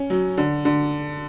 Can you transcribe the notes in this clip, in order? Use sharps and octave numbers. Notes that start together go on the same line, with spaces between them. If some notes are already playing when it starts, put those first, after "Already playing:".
Already playing: C#4
F#3
D3
D3